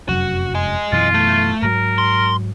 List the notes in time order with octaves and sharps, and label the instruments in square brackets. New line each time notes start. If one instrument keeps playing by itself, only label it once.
[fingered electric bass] F1 F#2 F#3 [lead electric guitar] F#4
[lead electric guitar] D#5 G#5
[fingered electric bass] F#2 B2 E3 [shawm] F4
[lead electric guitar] A3
[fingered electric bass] G#2 F#3 [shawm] A#4
[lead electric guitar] C6